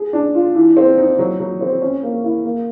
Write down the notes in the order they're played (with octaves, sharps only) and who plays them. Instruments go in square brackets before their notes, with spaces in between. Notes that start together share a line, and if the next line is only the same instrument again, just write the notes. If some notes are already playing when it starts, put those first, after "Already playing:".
Already playing: [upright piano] G#4
D4
F4
E3
C4
D#4
F#3
F#3
C4
C#4
A#3
E4
A#3